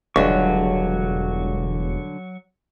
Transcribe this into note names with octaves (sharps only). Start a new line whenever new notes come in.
E1 C#2 D3 F#3 G3 D4 F#4 C#6